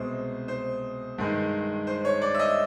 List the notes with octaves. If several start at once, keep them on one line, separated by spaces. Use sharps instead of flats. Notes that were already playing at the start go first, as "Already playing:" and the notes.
Already playing: C2 B2 G#3 C5
C5
G2 D#3 G#3
C5
C#5
D5
E5
D#5